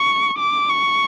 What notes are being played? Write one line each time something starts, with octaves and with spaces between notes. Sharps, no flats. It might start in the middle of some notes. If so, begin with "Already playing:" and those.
Already playing: C#6
D6
C#6